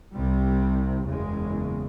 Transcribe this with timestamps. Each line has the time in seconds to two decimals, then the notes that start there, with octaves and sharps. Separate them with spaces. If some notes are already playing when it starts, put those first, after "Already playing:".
0.13 C2 C3 G3
1.07 F#1 E2 C#3 G#3